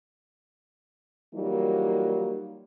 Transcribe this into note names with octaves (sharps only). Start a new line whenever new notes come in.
E3 F#3 G3 A#3 D#4 F4